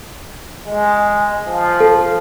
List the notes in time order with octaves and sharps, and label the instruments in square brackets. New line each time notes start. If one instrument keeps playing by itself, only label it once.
[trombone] G#3
F3
[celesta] A4